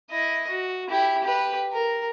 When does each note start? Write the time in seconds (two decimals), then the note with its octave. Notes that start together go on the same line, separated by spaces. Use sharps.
0.10 E4 D#5
0.50 F#4
0.90 E4 G4
1.23 G4 B4
1.73 A#4